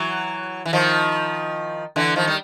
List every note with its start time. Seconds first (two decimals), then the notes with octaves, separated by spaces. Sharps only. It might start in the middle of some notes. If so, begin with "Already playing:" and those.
Already playing: E3 F#3
0.65 E3
0.73 D#3 F3
1.96 D3 E3
2.16 D#3 F3
2.27 G3